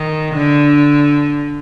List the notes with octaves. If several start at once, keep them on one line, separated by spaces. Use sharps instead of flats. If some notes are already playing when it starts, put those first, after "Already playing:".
Already playing: D#3
D3